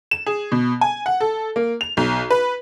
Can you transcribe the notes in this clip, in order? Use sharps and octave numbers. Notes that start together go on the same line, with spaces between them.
E7
G#4
B2
G#5
F#5
A4
A#3
F7
B1
B4